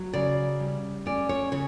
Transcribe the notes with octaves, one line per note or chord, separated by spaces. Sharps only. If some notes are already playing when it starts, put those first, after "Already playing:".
Already playing: F#3
C#3 D5
G3
C#4 D5
C#5
C#3 C#5